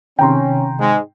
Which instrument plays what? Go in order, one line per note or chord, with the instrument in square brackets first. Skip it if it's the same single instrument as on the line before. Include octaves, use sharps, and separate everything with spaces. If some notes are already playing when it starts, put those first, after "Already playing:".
[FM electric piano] C3 D#3 [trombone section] C#4 [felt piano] G5 A#5 C6
[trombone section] G#2 G#3